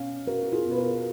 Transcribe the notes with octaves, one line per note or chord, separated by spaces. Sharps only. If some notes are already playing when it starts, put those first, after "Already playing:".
Already playing: B2 C#4 F5
C#4 F#4 A#4
F#4
F4 G#4
B2
B4
F#4 A#4